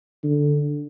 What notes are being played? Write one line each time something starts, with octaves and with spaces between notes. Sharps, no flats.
D3